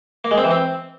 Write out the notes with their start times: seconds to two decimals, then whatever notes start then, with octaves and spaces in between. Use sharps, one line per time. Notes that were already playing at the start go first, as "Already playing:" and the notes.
0.24 A#3
0.31 G#3
0.38 C4
0.44 E3
0.51 C4